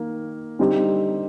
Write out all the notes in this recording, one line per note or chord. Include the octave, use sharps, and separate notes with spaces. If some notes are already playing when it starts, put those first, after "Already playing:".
Already playing: D#3 A#3
D3 G3 C4 D#4 G4